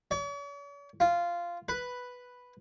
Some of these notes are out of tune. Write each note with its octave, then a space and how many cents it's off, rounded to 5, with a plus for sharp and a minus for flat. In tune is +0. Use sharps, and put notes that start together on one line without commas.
C#5 +45
F4 -10
B4 +0